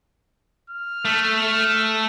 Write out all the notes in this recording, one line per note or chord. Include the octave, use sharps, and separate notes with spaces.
F6
A3